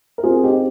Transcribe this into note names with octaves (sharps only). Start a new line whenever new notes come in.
A#4
C4 F4 G#4
D#4 G4